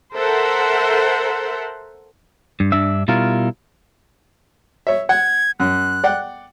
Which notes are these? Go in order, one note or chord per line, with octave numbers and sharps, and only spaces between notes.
A4 A#4 C5 E5 F#5
G2
G2 D4 E5
B2 G3 E4 F4 A#4
C#5 E5
F#5 G#6
F#2 F#6
D5 F#5 G5